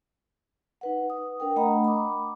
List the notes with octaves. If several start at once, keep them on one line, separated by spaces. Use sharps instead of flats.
D#4 B4 F#5
D#6
D4 A#4 G5
A3 D#5 F#5 A#5 B5 D#6
B5 D6